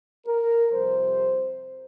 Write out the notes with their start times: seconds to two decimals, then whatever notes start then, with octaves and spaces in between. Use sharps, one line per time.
0.27 A#4
0.71 F2 C3 G3 C5